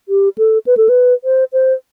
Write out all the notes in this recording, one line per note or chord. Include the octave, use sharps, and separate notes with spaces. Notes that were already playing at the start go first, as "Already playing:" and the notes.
G4
A4
B4
A4
B4
C5
C5